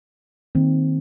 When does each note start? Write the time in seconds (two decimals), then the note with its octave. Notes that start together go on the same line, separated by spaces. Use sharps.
0.55 D#3 A#3 C4